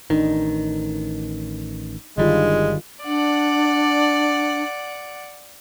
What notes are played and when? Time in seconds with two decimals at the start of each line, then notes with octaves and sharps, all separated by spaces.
0.10 A1 D#3 D4 D#4
2.17 G1 D3 D#3 G3 G#3 F4
3.05 D4 D5 F#5